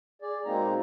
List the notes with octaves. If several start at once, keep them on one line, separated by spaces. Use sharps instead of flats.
G#4 D5
B2 G#3 A#3 C4 D#4 A#5